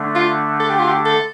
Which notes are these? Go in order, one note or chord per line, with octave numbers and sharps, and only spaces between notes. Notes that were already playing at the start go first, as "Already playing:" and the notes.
Already playing: D3 A3 D4
F4
A4
G4
F4
G4
A4